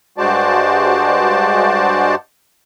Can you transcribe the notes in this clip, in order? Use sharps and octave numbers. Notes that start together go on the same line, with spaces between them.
G2 G#3 F#4 C5 D5 A5